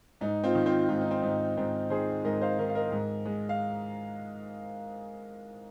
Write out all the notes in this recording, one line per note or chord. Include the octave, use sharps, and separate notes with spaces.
G#2 D#4
C4 F4
D#3
C4 F4
G#2 F4
D#4
C4
G#2 D#4
G#2 C4
D#3 G#4 C5
G#2 A#4 D#5
C5 F5
D#3 A#4 D#5
F5
A#4 D#5
G#2
G#3
F5